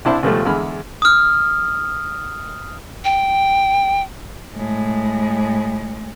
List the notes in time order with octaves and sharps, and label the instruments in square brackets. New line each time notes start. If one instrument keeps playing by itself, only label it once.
[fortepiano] C2 D4 E4 C5 A5
C#2 B2 F3 G3 A3
E2 D3 G#3 B5 F6
[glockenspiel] D#6 F6
[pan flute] G5
[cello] A2 G#3